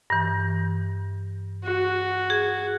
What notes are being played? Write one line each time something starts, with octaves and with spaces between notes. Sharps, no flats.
G2 E3
F#4
G#4